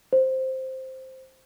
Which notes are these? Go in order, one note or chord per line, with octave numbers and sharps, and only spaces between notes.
C5